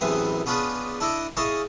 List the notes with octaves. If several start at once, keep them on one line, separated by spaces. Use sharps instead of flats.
A1 F#2 C3 E3 B3 G#4
B3 C#4 D4 F4 G#4 B4
D4 E4 A4 D#5 D6
E4 G#4 C#5 D#5 F5 A5